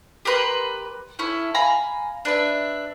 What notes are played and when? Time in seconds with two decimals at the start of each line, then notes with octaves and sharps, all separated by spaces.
0.25 G4 A#4 B4 C6
1.19 C#4 E4 A4
1.54 F5 G#5 A#5 B5
2.25 D4 B4 E5